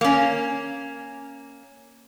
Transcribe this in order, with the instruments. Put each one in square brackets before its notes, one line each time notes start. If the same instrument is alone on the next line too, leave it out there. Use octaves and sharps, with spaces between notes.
[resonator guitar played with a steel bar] A#3 C#4